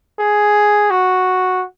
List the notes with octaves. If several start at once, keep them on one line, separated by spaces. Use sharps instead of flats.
G#4
F#4